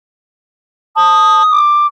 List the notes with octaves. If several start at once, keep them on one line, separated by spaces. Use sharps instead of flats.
A5 D#6
D6